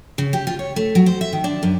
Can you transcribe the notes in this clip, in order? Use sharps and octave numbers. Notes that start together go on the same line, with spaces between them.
C#3
G4
F4
C#5
A3
F#3
C5
E5
D#3
D4
F#2